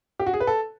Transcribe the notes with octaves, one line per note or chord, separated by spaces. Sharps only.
G4
F#4
G#4
B4
A4